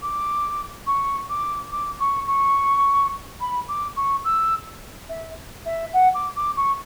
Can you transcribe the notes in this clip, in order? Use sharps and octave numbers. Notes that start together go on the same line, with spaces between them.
D6
C#6
D6
D6
C#6
C#6
B5
D6
C#6
E6
E5
E5
F#5
D6
D6
C#6